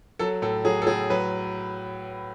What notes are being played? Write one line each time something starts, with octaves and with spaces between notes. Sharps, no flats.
F#3 A4
A2 A4
F#3 G#4
A4
A2 G#4
F#3 B4